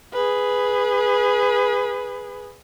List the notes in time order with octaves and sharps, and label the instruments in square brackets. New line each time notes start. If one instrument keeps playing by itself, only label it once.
[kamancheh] G#4 B4